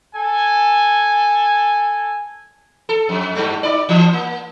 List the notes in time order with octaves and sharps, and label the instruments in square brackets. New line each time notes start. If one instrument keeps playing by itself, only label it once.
[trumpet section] A4 G#5
[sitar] A4
F2
G2 G3 A3
D#4 D5
E3
A#3